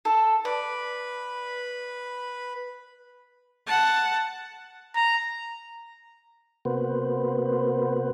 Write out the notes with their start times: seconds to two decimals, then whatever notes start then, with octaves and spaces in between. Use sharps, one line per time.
0.05 A4
0.45 B4 D5
3.67 F#5 A5
4.96 A#5
6.65 C3 A#3 B3 F#4 B4 C5